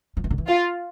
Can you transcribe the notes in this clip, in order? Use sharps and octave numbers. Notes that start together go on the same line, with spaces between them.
F3
E3
D3
E3
F4